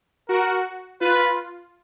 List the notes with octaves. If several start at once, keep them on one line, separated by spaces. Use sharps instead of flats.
F#4 A#4
F4 B4